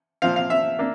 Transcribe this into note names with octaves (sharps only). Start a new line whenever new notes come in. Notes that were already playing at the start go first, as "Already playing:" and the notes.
A#2 F3 C4 F5
F5
E5
A#3 D4